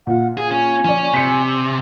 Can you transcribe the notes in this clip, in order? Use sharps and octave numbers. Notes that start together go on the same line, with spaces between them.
A#2 F4 F#5
G#4 G#5
C#4 G#5
F3 C#4 D5
C3 B6 C#7